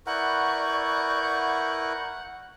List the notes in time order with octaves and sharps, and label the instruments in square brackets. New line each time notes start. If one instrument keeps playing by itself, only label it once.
[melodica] E4 A#4 B4 [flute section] D5 C#6 G6 [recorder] F#5